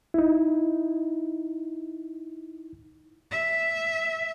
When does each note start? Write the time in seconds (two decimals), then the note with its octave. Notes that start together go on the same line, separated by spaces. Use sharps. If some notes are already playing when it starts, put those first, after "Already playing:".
0.14 D#4 E4
3.32 E5